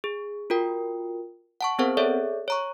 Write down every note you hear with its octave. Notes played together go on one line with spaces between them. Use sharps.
G#4
F4 F#4 A#4 G5
F#5 A5 C#6
B3 C4 G#4 A#4 C5 F#5
G#4 A4 C#5 D5 E5
C#5 A#5 C#6